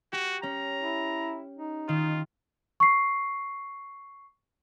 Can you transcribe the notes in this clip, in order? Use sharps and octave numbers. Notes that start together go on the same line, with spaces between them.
F#4 G4
C#4 A#5
E4
D#4
D#3 F4
C#6 C7